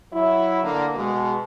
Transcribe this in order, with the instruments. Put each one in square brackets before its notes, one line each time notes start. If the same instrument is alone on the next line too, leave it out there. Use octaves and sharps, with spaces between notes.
[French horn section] F#3 E4
D3 A#3
B2 G#3